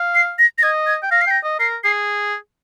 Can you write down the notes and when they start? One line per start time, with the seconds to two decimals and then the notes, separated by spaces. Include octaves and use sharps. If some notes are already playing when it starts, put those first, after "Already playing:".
Already playing: F5
0.14 C7
0.39 A#6
0.58 A#6
0.63 D#5 G#6
0.87 G#6
1.03 G5
1.11 F5 A#6
1.21 C7
1.27 G5 A#6
1.44 D#5
1.59 A#4 C7
1.84 G#4 C7